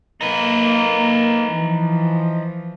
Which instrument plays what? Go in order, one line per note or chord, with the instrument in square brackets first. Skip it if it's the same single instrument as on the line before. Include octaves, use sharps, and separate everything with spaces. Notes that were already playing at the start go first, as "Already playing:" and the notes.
[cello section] A#3 [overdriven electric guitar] D#4 B4
[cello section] E3 F3